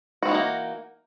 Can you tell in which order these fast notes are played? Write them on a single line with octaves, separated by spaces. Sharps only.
F#4 C4 E3 D#4 A#3